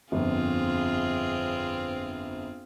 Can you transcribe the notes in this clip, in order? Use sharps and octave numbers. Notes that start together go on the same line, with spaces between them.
G1 F2 C4 F4 G#4